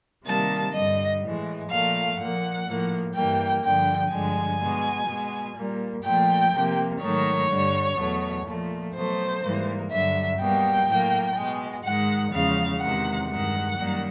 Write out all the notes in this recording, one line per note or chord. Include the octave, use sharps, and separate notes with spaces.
C3 D#3 G3 A#3 A5
G2 D3 G3 D#5
A2 E3 G#3
A#2 F3 A3 F5
A#2 F3 A#3 F#5
A2 F3 A#3
G2 E3 G3 A#3 G5
G2 D3 F3 G5
G2 D3 F3 G#3 G#5
B2 G#3
B2 G#3
A#2 G3 A#3
A#2 F3 A3 G5
C3 F3 A#3
G#2 D#3 F#3 A3 C#5
G2 D3 G3
E2 B2 F#3 A3
A#2 F3 A3
B2 F#3 A3 C5
G#2 E3 G3 A#3
G2 D3 F#3 E5
B2 G3 A#3 G5
A2 F#3 A#3
B2 G#3
G#2 D#3 G#3 F#5
E2 C#3 F3 G#3 F5
E2 C3 D#3 G#3 F#5
G2 D#3 G#3 F#5
F#2 D#3 G3 A#3